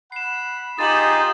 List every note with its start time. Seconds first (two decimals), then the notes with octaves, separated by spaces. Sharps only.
0.12 F#5 B5 C7 E7
0.79 D#4 F4 G4 G#4 D#6 A6 E7 F#7